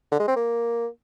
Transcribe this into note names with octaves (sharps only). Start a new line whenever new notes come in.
D3
G#3
C4
A#3